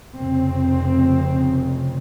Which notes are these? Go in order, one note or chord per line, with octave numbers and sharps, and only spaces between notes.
F1 F2 C#3 C4